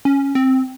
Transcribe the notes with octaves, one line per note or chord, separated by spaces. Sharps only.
C#4
C4